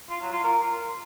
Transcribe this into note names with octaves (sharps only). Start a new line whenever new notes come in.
F4
F#3
F4
A#4